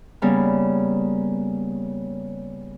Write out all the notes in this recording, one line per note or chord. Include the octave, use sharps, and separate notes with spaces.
C#3 G3 A#3 B3